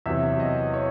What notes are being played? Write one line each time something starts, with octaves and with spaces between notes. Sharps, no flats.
E2 C3 F#3 E5
D#5
C#5